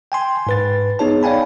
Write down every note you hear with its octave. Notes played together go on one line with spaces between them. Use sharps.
G5 G#5 C6
G#2 B4 A6
B3 D#4 G#4 C#5 A5
C#5 D5 F5 G5 G#5 B5